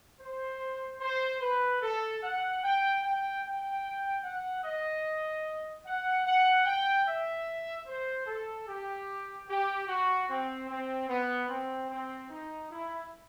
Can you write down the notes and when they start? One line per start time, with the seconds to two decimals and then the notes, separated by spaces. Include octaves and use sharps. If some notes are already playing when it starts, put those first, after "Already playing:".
0.20 C5
1.01 C5
1.41 B4
1.82 A4
2.22 F#5
2.63 G5
3.03 G5
3.43 G5
4.23 F#5
4.63 D#5
5.85 F#5
6.25 F#5
6.65 G5
7.06 E5
7.87 C5
8.27 A4
8.67 G4
9.48 G4
9.88 F#4
10.28 C4
10.69 C4
11.09 B3
11.49 C4
11.90 C4
12.30 D#4
12.70 E4